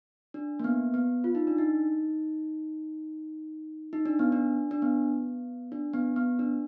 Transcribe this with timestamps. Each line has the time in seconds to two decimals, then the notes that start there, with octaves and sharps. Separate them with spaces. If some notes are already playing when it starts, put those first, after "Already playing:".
0.34 D4
0.60 A#3
0.64 B3
0.94 B3
1.24 F4
1.35 D#4
1.47 D4
1.58 D#4
3.93 D#4
4.06 D4
4.19 B3
4.32 D4
4.71 D4
4.82 B3
5.72 D4
5.94 B3
6.16 B3
6.39 D4